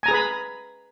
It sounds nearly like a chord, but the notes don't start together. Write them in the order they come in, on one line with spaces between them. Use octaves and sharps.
G#5 A#5 G#4 B4 B5